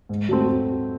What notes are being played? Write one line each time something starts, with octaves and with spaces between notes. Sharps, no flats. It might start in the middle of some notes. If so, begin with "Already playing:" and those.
G#2
F#3 A3 C4